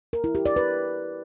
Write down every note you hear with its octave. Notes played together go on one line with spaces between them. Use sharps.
A#4
E4
G4
D5
B4